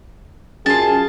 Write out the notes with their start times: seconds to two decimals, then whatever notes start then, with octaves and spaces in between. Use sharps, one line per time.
0.66 F#2 F4 G#4 A5